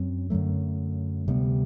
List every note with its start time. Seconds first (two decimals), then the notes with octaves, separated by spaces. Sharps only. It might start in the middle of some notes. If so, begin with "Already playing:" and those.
Already playing: F#2 F#3 C4
0.30 F#2 D3 F#3 A3
1.28 D2 C3 G3 B3